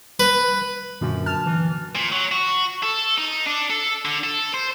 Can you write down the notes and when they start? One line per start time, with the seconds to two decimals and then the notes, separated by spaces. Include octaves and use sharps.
0.20 B4
1.01 F#2 A#2 D3 F#3
1.26 A5 F6
1.46 E3
1.95 A#2
2.12 F#3
2.32 F#4
2.83 A4
3.18 D#4
3.47 D4
3.70 A4
4.05 D3
4.24 A4
4.54 C5